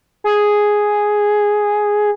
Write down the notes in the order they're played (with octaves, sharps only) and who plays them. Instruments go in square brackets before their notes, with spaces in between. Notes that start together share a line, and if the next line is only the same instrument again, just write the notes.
[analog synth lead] G#4